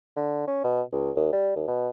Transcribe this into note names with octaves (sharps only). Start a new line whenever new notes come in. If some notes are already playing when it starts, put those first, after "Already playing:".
D3
C#4
B2
C#2
D#2
G3
D#2
B2